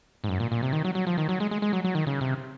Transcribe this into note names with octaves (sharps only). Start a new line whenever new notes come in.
G#2
F#2
A#2
A#2
C3
D#3
F#3
F#3
F3
D#3
F#3
G#3
G#3
G#3
F#3
F#3
D#3
C#3
C3